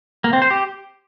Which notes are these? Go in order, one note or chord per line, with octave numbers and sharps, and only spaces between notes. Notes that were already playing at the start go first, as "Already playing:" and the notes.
A#3
C4
C5
G4